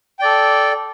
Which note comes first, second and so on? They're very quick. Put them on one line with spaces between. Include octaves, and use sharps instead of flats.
G5 D5 A4